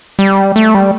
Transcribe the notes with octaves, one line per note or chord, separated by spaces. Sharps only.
G3
A3
G3